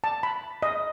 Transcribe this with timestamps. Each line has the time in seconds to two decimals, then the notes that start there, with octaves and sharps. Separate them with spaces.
0.04 A5
0.23 B5
0.62 D#5